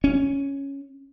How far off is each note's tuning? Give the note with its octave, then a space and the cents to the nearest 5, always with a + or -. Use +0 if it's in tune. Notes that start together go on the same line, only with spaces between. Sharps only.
C#4 +0